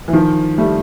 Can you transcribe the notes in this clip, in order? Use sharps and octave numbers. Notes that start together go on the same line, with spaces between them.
E3
D#3 F3
G3 A3